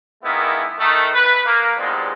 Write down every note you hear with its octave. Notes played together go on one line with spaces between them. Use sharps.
D#3 G#3 A#3 B3 E4
D#3 A3
B4
A#3
E2 G2 A#2 F3 G3 G#3